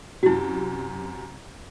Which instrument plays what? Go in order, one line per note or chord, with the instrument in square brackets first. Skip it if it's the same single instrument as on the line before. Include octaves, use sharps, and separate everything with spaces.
[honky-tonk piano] F#2 C3 [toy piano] E4 F#4